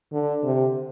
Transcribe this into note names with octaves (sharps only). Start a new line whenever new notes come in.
D3
C3